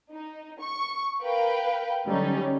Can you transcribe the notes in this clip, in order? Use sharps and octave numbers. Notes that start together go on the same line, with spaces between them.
D#4
C#6
A#4 B4 F5 G5
D3 F#3 G3 C#4 D#4